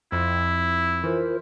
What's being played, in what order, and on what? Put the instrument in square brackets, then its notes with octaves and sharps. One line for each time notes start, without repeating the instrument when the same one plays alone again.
[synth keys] F2 [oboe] E4
[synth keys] E3 [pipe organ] F4 A#4 C5